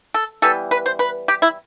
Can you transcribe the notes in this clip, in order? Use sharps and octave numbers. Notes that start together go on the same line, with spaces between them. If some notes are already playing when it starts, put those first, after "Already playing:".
A4
E3 G3 B3 A4
B4
C5
B4
G4
E4